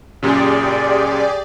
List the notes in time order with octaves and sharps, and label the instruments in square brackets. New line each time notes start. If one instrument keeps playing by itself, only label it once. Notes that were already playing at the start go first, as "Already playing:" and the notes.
[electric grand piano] F#2 A#2 C#3 [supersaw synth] G4 G#4 [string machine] D5